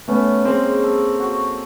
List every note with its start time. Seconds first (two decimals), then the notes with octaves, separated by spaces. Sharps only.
0.08 A3 B3 C#4
0.45 G#3 A#3 C4
0.83 A4
1.20 F#4